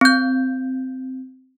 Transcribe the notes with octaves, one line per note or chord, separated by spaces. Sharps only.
C4 G6